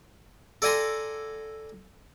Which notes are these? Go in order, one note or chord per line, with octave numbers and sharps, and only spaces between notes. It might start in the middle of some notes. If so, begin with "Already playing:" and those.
A4 D5 F#5 G#5 A#5 C6